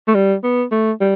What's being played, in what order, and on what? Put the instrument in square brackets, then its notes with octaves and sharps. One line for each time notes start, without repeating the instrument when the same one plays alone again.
[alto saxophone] A3
G3
B3
A3
G3